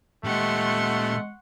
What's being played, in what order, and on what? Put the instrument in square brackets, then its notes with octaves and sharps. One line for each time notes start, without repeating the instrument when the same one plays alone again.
[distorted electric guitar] A#2 G4 [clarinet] G#3 [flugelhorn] A3 [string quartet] F#5 C6 C#6